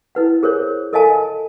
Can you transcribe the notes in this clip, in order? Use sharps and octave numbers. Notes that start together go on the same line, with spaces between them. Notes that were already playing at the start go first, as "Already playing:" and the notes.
E4 B4 F#5
G#4 A#4 C5 C#5
A4 A#4 D#5 F5 G#5 A5